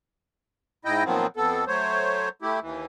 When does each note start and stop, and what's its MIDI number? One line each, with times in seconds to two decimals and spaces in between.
0.85 1.04 44
0.85 1.04 64
0.85 1.04 75
0.85 1.04 79
1.05 1.27 46
1.05 1.27 51
1.05 1.27 53
1.05 1.27 54
1.05 1.27 59
1.05 1.27 60
1.37 1.65 41
1.37 1.65 59
1.37 1.65 69
1.67 2.29 54
1.67 2.29 57
1.67 2.29 72
1.67 2.29 73
2.42 2.60 57
2.42 2.60 64
2.42 2.60 67
2.61 2.85 39
2.61 2.85 52